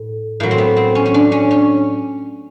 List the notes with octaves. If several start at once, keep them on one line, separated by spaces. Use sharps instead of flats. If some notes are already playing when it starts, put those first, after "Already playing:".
Already playing: A2
A2 F#3 A#3
C4
B3
C4
C#4
C#4
D4
C#4
C#4